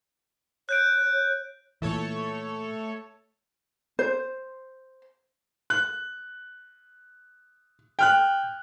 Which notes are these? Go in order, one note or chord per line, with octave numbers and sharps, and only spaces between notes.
C#5 F#6 G6 D7
A#2 E3 A3 A4 C#5
C5
F#6
G5 F6 F#6